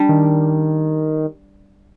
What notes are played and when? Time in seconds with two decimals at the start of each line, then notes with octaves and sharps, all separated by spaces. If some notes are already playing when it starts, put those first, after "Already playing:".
Already playing: G3 D4
0.09 D#3